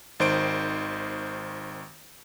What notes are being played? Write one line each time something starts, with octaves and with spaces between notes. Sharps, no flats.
G#1 D#3 C5 G6 D7